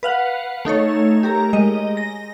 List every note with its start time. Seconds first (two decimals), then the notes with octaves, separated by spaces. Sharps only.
0.03 B4 F5 F#5
0.65 A3 D#4 A4 C#5
1.23 G4 A#4 A#5
1.53 G#3 D#5
1.97 A#6